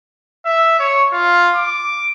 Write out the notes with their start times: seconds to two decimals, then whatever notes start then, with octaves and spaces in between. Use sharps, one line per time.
0.46 E5
0.79 C#5
1.13 F4
1.56 D6